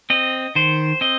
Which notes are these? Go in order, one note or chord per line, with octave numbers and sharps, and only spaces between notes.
C4 D#5
D#3 C5
C4 D#5